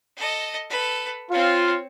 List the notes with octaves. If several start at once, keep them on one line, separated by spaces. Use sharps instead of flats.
A4 D#5
A4 B4
C4 F4 C#5